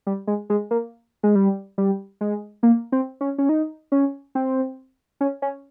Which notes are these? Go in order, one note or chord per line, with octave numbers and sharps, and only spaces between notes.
G3
G#3
G#3
A#3
G#3
G3
G3
G#3
A#3
C4
C#4
C#4
D#4
C#4
C4
C#4
C#4